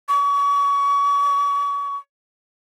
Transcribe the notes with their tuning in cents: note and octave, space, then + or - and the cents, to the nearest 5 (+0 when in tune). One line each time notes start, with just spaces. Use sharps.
C#6 +35